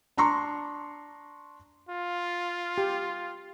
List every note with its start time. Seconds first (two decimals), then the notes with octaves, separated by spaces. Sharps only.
0.18 D4 A#5 C6 C#6
1.89 F4
2.78 G4